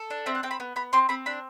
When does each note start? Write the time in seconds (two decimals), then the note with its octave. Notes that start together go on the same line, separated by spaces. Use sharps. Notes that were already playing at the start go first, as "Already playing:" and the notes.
Already playing: A4
0.10 D4
0.26 C4 E5
0.35 F#5
0.43 C4 G5
0.51 B5
0.60 B3
0.76 B3 B5
0.93 C4 C6
1.09 C4 B5
1.26 D4 B5